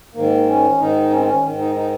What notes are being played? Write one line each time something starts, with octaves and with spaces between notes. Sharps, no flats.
G#2 D#3 A#3
C#4
G#2 D#3 D#4
C#4
C4
C#4
G#2 D#3
D#4
D#4